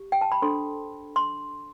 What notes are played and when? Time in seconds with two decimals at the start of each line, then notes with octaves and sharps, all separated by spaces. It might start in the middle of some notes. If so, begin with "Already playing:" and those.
Already playing: G4
0.12 G5
0.21 A5
0.32 B5
0.42 D4 A4 C5 C6
1.16 C6